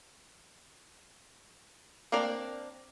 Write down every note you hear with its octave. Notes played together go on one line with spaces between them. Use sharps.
A#3 C4 D4 A#4 D5